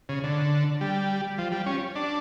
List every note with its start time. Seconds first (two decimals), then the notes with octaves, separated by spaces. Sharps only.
0.09 C#3
0.24 D3
0.81 G3
1.38 F3
1.52 G3
1.66 C#4
1.95 D4